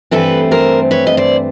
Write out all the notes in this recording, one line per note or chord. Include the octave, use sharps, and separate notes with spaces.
G2 E3 A3 C4 A4 B4
A#4 C5
B4 C#5
D#5
C5 D5